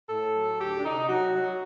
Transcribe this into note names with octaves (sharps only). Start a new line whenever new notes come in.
A2 A4
F#3
D2 G4
D4
C3 D#4
F#3 F#4
F#3